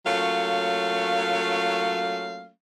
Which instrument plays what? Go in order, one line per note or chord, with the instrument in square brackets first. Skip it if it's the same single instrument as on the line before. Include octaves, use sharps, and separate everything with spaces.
[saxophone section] F#3 A3 A#3 C#4 F4 F5